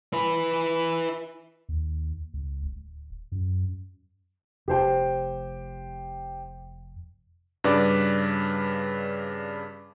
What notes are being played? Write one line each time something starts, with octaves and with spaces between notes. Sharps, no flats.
E4 B4
D#2
C#2
D1
F#2
F1 G4 C5 G5
G2 C#3 B4 D5 D6